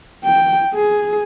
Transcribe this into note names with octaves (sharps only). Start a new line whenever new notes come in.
G5
G#4